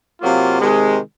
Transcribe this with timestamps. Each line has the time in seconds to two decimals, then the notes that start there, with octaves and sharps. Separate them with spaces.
0.21 C3 F#3 A#3 F4
0.60 C3 D#3 G#3